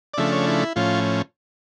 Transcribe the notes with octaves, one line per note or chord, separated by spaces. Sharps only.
D5
C#3 F3 A3 D4 E5
C#5
E4
A2 F3 C#4 F4